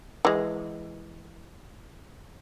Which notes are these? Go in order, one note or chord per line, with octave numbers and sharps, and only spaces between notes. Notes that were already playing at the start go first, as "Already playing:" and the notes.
E3 G#3